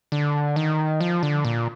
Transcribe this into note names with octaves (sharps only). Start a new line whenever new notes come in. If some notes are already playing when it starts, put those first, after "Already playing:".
D3
D#3
F3
D3
A#2